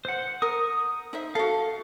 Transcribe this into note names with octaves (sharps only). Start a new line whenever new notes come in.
C5 F#5
A#4 D#6
D#4 C5 E5
F#4 A4 F5